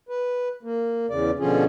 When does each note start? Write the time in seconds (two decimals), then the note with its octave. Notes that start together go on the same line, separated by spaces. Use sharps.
0.09 B4
0.63 A#3
1.10 E2 C#3 D5
1.39 B2 D3 F3 C#4 F4 G#4